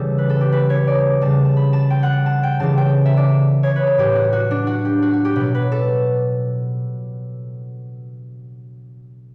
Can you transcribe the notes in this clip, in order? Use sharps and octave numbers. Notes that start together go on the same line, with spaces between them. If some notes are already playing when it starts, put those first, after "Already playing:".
Already playing: C#3 E3 G3 A4
B4
A4
G4
B4
C#5
D5
C#3 G3 A5
A5
B5
A5
G5
F#5
A5
G5
C#3 E3 G3 A5
G5
E5
D5
C#5
B4
A4
A2 F#3 G4
F#4
F#4
D4
F#4
G4
F#4
F#4
G4
B2 F#3 B4
B4
A4